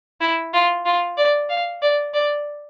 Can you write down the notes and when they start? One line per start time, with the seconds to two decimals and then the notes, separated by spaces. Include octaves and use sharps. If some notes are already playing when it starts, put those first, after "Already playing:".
0.21 E4
0.53 F4
0.85 F4
1.17 D5
1.50 F5
1.82 D5
2.14 D5